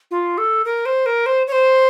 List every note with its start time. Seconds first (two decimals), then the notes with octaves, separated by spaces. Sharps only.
0.11 F4
0.38 A4
0.65 A#4
0.85 C5
1.06 A#4
1.26 C5
1.47 C#5
1.52 C5